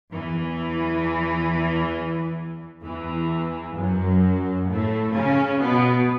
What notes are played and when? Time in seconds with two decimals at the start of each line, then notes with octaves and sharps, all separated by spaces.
0.10 E2 E3
2.86 E2 E3
3.78 F#2 F#3
4.70 A2 A3
5.16 C#3 C#4
5.62 B2 B3